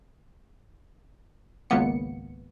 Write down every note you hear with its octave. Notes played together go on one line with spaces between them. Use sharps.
G#1 C#2 A#3 B3 C#7